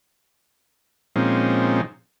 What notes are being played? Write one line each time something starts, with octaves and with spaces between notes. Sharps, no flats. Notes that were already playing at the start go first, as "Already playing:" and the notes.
A#2 F3 G#3 C4 C#4 D#4